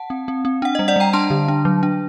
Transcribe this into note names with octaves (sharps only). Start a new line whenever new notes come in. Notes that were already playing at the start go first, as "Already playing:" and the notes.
Already playing: F#5 A5
C4
C4
C4
D4 F#5
D#5
G3
D5 F#5
G3 G5 A#5
D4 A5 C6
D3
D4
F#3
D4